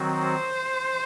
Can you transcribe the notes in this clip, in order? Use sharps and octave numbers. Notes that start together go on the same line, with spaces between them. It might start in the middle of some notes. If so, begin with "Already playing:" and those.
Already playing: D#3 F#3 C4 F#4
C5